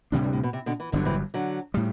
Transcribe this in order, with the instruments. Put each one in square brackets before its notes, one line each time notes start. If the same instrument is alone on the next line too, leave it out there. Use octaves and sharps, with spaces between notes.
[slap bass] D2 C3 G3 D4 [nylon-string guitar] A2
[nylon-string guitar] G2
A2
B2
C3
B2 D3
E3
[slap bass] G1 G2 F#3 [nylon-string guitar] D3
[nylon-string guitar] C3 E3
D3 F#3
[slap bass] A2 G3